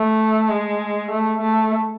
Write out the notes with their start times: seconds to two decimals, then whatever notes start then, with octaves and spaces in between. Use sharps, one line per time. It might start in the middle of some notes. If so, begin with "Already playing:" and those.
Already playing: A3
0.49 G#3
1.11 A3
1.41 A3